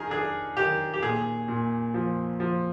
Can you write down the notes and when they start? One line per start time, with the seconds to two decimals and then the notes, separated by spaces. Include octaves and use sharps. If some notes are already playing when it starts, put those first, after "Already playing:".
Already playing: D#3 G#4 A#4
0.10 D4 G#4
0.56 D#3 G4
0.94 G4
1.03 A#2 G#4
1.48 A#2
1.94 F3
2.40 F3